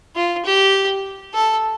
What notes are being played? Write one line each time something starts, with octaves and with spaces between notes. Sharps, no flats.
F4
G4
A4